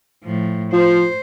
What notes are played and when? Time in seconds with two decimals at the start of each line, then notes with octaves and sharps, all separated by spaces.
0.23 A2 F3
0.72 F3 C5